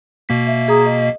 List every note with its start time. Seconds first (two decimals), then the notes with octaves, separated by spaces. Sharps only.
0.29 B2 A#3 B6
0.47 E5
0.68 G#4 A#5 D#6
0.86 D#5